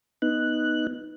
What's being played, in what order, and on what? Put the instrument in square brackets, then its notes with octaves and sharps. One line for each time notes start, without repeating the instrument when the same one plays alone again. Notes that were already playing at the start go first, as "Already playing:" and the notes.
[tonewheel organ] B3 D#4 F#6